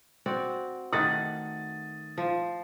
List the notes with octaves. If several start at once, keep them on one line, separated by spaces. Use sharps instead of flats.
C4 F#4 D5
D#3 A3 F#5 D#6 A6
F3